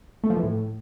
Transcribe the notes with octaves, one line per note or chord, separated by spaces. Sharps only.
A3
F3
E3
A2